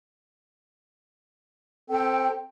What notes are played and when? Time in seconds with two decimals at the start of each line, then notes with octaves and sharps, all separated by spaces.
1.90 C4 A4 G5